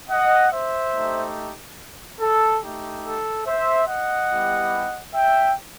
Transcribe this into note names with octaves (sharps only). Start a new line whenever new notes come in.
D#5 F#5
C5 E5
A3 D#4 G4
A4
A3 D#4 G4
A4
C5 E5
D#5 F#5
G3 B3 E4 G4
E5 G5